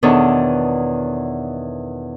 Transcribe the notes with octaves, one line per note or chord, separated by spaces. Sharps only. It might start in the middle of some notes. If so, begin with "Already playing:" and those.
E2 B2 D#3 D4 A4 C#5